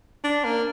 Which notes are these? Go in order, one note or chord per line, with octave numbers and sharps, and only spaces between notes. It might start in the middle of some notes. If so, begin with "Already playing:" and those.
D4
A#3